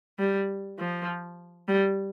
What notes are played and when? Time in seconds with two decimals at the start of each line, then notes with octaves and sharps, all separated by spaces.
0.19 G3
0.79 F3
1.68 G3